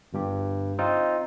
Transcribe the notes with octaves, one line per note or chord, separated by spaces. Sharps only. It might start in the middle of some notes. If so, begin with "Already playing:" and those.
G1 G2 G4
C4 D#4 F4